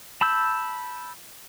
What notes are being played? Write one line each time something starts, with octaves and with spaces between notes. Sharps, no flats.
A5 B5 E6 G6